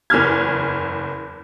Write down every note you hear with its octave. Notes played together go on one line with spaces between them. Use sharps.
F#1 E2 F6 G#6